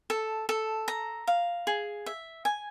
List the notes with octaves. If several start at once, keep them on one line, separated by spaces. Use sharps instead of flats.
A4
A4
A#5
F5
G#4
E5
G#5